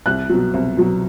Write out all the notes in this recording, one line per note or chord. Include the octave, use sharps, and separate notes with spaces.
C2 F#6
B2 F#3
C2
B2 F#3